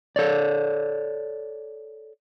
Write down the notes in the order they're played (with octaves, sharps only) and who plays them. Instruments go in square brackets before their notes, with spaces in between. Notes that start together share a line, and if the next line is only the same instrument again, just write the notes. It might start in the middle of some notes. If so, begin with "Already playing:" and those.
[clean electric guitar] A4 C#5 D5